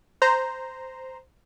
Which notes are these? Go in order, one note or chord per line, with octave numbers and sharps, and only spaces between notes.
C5 A#5